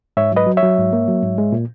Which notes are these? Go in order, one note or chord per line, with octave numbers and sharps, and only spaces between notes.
G#2 C#5 E5
F#3 B4 D#5
F#3
C#5 E5
F#3
G#2
A#3
F#3
G#2
G#3
A#2